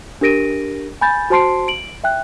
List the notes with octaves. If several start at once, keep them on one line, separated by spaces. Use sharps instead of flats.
D4 G4 A#4 A#6 D7 D#7
G#5 B5 G6 A6
F#4 C5 A5 C6 C7 D7
D7 F#7
E5 G5 F#6